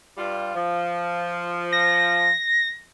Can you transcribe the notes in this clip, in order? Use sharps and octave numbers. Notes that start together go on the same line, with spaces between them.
G2 G3 F4
F3
A#6